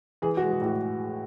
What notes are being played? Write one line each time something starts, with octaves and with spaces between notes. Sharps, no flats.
E3 G#4
F#4
G#3
G#4
A2 F#4